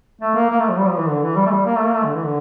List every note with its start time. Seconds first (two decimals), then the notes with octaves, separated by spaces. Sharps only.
0.22 A3
0.35 A#3
0.50 A#3
0.59 A3
0.69 F3
0.78 G3
0.88 F3
0.98 E3
1.08 D3
1.23 E3
1.36 G3
1.46 A3
1.51 G3
1.66 A#3
1.75 A3
1.84 A#3
1.94 A3
2.04 D3
2.14 E3
2.23 D3